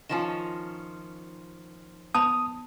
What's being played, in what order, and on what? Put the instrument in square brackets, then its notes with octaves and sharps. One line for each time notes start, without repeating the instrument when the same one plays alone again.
[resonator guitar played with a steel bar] D#3 F3 C#4 [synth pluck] F4 A5 E7
[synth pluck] B3 [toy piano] A5 B5 [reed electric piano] D#6